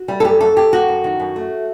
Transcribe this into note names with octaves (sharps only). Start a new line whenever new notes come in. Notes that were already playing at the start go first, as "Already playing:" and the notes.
Already playing: F#4
G3
A4
F#2 G4
F#2 A4
F#2 G4
F#2 F#4
F#2
D#3
F#2
A3